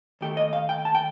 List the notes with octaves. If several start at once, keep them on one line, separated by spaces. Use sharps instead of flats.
D#2 D#3 A3 G4
D#5
F5
G5
A5
G5